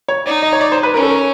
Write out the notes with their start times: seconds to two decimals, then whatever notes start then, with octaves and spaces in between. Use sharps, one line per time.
0.08 C#5
0.26 D#4 D5
0.42 D#5
0.53 C#5
0.61 D5
0.72 C5
0.83 B4
0.94 C#4 A#4
1.02 A4
1.10 A#4